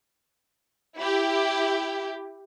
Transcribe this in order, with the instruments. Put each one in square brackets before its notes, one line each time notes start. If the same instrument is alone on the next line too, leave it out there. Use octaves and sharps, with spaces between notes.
[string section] E4 G4